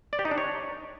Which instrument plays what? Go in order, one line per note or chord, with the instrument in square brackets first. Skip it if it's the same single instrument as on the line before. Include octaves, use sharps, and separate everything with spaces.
[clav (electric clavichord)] D5
G4
D#4
D4
C#5